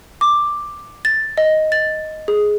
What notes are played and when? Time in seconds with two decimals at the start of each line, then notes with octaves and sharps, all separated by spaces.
0.21 D6
1.05 A6
1.38 D#5
1.72 A6
2.28 G#4